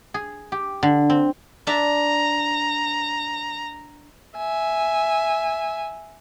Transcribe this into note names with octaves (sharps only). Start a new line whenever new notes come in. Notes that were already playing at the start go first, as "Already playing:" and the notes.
G#4
G4
D3
C4
D4 E5 A5 A#5
E5 G#5